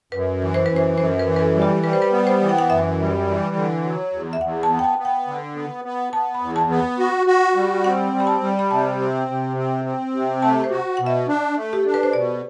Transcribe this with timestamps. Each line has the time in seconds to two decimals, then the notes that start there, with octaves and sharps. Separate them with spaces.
0.12 F#2 B4
0.41 E3
0.54 C5
0.66 F#2 B4
0.76 C5
0.98 F#2 C5
1.19 B4
1.26 E3
1.36 B4
1.41 A4
1.55 G3
1.62 G4
1.83 G3 B4
1.93 C5
2.02 B4
2.12 B3
2.27 C5
2.41 E3
2.49 G5
2.58 F#5
2.69 F#2 E5
2.99 G3
3.27 E3
3.55 D3
3.83 F#3
4.13 E2
4.33 E5
4.41 E2 F#5
4.63 A5
4.70 B3
4.79 G5
4.84 A5
4.98 B3
5.05 G5
5.28 D3
5.56 B3
5.84 B3
6.13 B3 A5
6.34 B5
6.42 E2
6.56 A5
6.70 B3
6.99 F#4
7.27 F#4
7.56 G3
7.84 C4 F#5
8.13 G3
8.20 B5
8.27 A5
8.41 G3
8.59 B5
8.70 C3 A5
8.99 C4
9.28 C3
9.57 C4
9.85 C4
10.13 C3
10.42 A3 A5
10.64 C5
10.71 F#4
10.97 B2 F#5
11.06 E5
11.28 D4
11.56 A3
11.73 G4
11.83 D4 A4
11.94 B4
12.03 C5
12.13 B2 D5